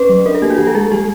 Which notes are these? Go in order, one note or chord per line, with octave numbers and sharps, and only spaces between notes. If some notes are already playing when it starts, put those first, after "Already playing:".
Already playing: C#4 B4
F#3
D4 A#4
A4
A#3 G4
F#4
F3 G4
A4
G#3 G#4
G3 G4